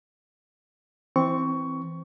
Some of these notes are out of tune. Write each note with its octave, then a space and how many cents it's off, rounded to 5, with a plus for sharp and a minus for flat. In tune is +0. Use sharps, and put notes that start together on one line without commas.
E3 +0 C4 +0 C#6 +15